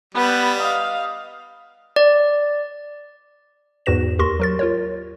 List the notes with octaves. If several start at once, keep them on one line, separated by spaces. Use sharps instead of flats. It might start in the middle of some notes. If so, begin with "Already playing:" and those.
G3 B3 B4
D#5 F5
D5
E2 G#2 F#4 B4 A#6 E7
D#2 G4 A#4 C6 C#6 A#6
F#3 A#4 A6
F4 A#4 C#5